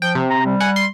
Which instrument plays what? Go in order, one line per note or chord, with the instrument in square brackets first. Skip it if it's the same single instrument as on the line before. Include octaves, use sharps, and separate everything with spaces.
[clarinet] F3 [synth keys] G5
[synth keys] C3
[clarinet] A#5
G3
[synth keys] F#5 G#5
C6